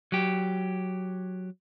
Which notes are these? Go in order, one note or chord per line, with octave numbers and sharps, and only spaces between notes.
F#3 G4